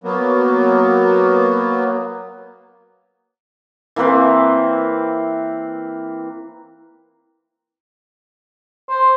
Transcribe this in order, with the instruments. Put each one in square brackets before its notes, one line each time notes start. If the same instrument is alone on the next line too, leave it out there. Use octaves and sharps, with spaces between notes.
[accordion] F#3 A#3 B3
[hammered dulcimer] E3 A#3 C4 B4
[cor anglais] C5